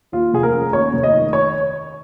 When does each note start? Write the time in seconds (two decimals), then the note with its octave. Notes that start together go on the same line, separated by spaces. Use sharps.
0.12 D#2 F4
0.33 F1 G#4
0.43 A#4
0.53 C#4
0.72 D#2 C#5
0.93 F1
1.03 D#5
1.13 D#3
1.33 C#5